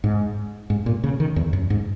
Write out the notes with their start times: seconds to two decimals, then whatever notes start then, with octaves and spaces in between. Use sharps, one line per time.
0.04 G#2
0.70 G#2
0.86 A#2
1.04 C#3
1.20 D#3
1.36 E2
1.53 F#2
1.70 G#2